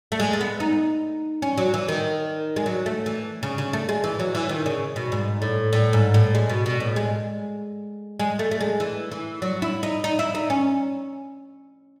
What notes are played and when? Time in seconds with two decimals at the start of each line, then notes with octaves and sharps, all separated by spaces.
0.12 A3
0.20 G#3
0.33 A3
0.41 B3
0.60 D#4
1.42 C#4
1.58 F#3
1.74 E3
1.88 D#3
2.56 G#3
2.66 F#3
2.86 A3
3.06 E3
3.43 C#3
3.58 C#3
3.73 A3
3.89 G#3
4.04 E3
4.20 F#3
4.35 E3
4.49 D#3
4.66 C#3
4.96 B2
5.12 G#2
5.42 A2
5.73 A2
5.93 G#2
6.14 A2
6.35 G#3
6.50 B2
6.66 B2
6.80 A2
6.96 G#3
8.20 G#3
8.39 A3
8.51 A3
8.61 G#3
8.80 E3
9.11 E3
9.42 F#3
9.62 E4
9.83 D#4
10.04 D#4
10.19 E4
10.35 D#4
10.50 C#4